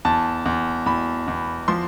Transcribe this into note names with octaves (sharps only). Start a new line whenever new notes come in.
E2 A5
E2
E2 B5
E2
F3 C6